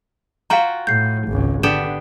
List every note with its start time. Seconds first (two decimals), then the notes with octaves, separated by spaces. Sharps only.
0.50 F4 F#4 F5 G5 A#5
0.87 A2 G6 C7
1.28 G#1 C#2
1.63 D3 B3 D4 G4 E7